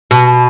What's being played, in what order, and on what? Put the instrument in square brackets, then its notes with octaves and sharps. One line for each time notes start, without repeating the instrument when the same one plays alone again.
[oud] B2